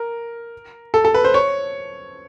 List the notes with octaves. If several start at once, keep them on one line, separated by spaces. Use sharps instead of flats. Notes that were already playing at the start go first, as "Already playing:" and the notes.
Already playing: A#4
A4
A4
B4
C5
C#5